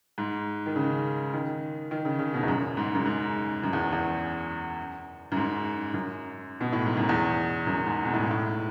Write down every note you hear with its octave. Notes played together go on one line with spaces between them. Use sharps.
G#2
D#3
C#3
D#3
D#3
C#3
C#3
B2
E2
F#2
G#2
F#2
G#2
F#2
E2
E2
F#2
G#2
F#2
B2
A2
G#2
F#2
E2
F#2
G#2
B2
A2
G#2
A2